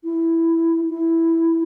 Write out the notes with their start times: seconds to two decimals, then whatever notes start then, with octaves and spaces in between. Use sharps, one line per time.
0.04 E4
0.89 E4